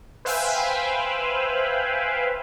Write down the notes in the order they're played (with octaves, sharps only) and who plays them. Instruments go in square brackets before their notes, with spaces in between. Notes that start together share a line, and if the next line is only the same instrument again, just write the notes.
[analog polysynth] B4 C5 E5 F5 G5 G#5